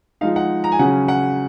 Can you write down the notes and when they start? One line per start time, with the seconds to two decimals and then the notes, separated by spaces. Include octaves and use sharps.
0.21 F3 G#3 D#4 F5
0.36 F#5
0.64 A#5
0.72 G#5
0.79 C#3 F#3 C#4 F#5
1.08 F#5